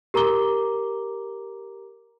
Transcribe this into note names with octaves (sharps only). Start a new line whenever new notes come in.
G4 A#4 A#5 D6 G7